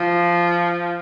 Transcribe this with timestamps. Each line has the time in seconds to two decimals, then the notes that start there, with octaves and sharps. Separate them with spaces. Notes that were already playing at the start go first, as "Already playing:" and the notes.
Already playing: F3